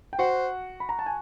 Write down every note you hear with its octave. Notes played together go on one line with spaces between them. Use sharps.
G5
F#4 C5 F#5
B5
A#5
A5
G#5